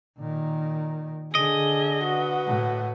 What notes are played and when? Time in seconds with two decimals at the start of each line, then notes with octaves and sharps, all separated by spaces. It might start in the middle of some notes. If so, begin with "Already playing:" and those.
0.18 A#2 D#3
1.35 D3 G#4 D#5
2.05 F#4 B4
2.46 A2